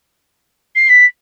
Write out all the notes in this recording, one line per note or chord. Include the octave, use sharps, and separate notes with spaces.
C7
B6